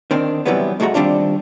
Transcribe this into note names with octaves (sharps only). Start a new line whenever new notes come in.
D#3 C4 D4
C3 E3 F#3 G3 B3
C2 G#3 A3 F#4 A#5
D#3 G3 C4 D4 F4